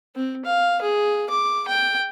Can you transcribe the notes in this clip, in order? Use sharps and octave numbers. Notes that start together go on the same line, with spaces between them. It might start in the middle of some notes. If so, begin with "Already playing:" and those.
C4
F5
G#4
D6
G5